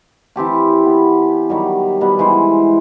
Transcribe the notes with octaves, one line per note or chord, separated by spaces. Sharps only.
E3 C4 G4 A5
B3
D#3 F#3 G3
B2 G3 B3
E3 G#3 C5